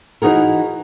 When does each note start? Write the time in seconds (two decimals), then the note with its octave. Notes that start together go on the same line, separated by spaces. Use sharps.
0.22 E3 D#4 F#4 G#4 A#4